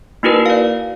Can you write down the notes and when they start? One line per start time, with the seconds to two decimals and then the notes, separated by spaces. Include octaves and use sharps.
0.23 A#3 D#4 E4 F#4 A#4 B4
0.46 D5 F5